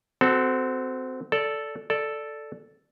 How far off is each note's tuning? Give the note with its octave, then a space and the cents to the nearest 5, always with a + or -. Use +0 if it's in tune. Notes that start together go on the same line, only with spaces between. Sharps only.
C4 -20 F#4 +5 A4 -5
A4 +0 D5 -15
A4 +0 D5 +0